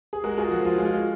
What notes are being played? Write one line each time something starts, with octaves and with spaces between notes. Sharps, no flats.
G#4
G#3 F#4 A#4
F4 G#4
F3 F#4
F4
G#3 F4